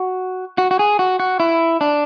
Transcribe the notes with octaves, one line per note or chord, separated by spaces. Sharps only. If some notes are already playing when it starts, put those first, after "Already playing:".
Already playing: F#4
F#4
F#4
G#4
F#4
F#4
E4
D4